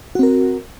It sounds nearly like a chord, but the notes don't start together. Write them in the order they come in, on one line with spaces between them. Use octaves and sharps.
F#4 C4 A#4